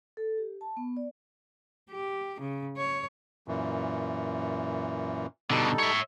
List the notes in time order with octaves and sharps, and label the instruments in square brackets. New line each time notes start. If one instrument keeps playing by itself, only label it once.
[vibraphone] A4
G4
A5
B3
D5
[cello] G4
C#3
C#5
[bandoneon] F#2 A#2 E3
[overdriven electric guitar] B2 D3 [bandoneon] G3 D#4 A4
[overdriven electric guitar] C#5 E5